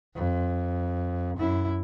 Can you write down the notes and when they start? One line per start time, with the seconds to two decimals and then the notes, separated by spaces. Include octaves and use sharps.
0.15 F2
1.37 F#2 E4